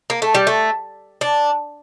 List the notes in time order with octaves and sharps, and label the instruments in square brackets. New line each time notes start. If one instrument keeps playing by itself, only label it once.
[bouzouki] A#3
A3
G3
A3
D4